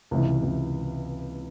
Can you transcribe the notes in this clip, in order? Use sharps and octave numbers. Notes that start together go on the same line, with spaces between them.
C#2 C3 E3
C#2 C3 E3